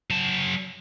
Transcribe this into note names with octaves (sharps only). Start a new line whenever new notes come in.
F#3 A5